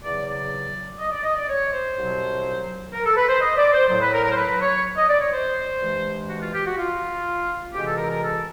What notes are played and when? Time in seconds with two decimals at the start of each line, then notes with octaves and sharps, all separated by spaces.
0.04 E2 C#3 F#3 D5
0.27 D5
1.00 D#5
1.12 D5
1.24 D#5
1.36 D5
1.48 C#5
1.72 C5
1.96 C2 B2 F#3
2.93 A#4
3.05 A4
3.17 B4
3.29 C5
3.41 D#5
3.57 D5
3.73 C5
3.88 A2 F#3 C5
4.01 B4
4.13 A#4
4.25 A#4
4.31 C5
4.36 B4
4.61 C#5
4.97 D#5
5.08 D5
5.21 C#5
5.33 C5
5.81 G2 E3 G#3
6.29 F#4
6.41 F4
6.53 G4
6.66 F#4
6.78 F4
7.73 D2 C3 E3 G#3 G4
7.86 A4
7.97 A#4
8.10 A#4
8.22 A4